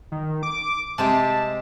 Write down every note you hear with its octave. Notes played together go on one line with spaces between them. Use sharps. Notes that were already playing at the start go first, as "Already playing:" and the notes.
D#3
D6
C3 G#3 G4 A5